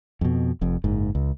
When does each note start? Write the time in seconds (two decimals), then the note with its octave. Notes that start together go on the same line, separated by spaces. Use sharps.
0.21 F2 B2
0.61 F1 F2
0.84 F#1 G#2
1.15 C#2